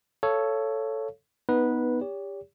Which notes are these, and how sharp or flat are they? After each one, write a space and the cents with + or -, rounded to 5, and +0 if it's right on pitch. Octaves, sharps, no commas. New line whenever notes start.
A4 +0 C#5 +5 F5 -25
B3 +0 D#4 +0 B4 -10
G4 +25 C#5 +45